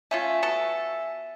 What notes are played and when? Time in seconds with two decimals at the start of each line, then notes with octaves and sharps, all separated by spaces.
0.11 A3 C#4 F4 E5 G#5
0.42 B3 F#4 A4